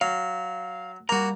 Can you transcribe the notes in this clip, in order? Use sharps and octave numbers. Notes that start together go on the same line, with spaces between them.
F#3 F5
G3 A#3 F#4 A#5